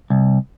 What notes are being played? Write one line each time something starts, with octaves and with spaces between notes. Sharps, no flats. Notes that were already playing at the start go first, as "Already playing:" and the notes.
C2